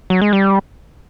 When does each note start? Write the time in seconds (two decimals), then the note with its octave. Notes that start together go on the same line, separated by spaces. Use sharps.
0.10 F#3
0.21 G#3
0.33 G3